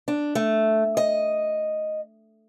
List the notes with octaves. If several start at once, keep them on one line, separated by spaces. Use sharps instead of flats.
D4
A3
D#5